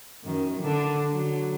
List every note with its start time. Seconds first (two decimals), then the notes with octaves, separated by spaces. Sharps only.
0.24 F#2 D#3
0.60 D3 D4
1.12 D3 F#3